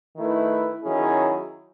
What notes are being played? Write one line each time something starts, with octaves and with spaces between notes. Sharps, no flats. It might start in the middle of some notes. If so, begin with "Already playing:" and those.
D#3 A3 E4 B4
D#3 F#3 C#4 E4 G#4